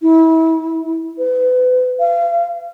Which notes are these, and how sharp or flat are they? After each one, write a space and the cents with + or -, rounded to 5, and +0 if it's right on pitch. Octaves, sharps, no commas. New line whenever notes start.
E4 -30
B4 +35
F5 -35